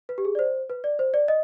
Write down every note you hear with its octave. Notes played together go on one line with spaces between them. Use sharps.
B4
G4
G#4
D5
C5
B4
D5
C5
D5
D#5